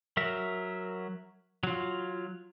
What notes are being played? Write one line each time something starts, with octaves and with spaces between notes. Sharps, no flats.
F#3 A#4 E5
F#3 F4